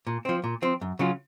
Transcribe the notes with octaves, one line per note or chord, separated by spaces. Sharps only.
A#2
F3 C4
A#2
F3 C4
F#2
C#3 F#3 C#4 F4